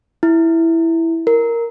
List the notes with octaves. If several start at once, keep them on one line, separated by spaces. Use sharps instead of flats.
E4
A#4